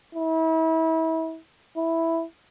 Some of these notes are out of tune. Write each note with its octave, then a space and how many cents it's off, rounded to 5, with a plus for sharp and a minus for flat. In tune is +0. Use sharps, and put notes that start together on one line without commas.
E4 -35
E4 +0